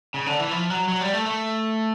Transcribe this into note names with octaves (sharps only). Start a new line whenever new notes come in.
C#3
D3
E3
F3
F#3
F#3
G3
A3
A3